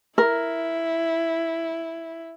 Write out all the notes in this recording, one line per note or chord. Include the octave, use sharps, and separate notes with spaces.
E4 A#4